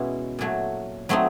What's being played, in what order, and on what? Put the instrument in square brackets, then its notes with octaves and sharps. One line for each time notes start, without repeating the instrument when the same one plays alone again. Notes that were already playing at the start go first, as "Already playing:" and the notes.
Already playing: [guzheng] B2 G#3 C#4 E4
A#2 F#3 A3
F#3 A3 C4 D#4